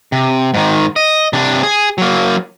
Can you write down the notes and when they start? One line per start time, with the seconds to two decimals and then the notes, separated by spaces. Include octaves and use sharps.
0.12 C3
0.54 G#2 D#3
0.96 D#5
1.33 C3 D4
1.63 G#4
1.98 F#3 A#3